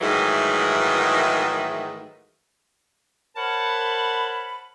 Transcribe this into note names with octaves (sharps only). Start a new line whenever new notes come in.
G#2 D#3 E3 F#3 G#3 A3
A#4 C5 C#5 F#5 A5 B5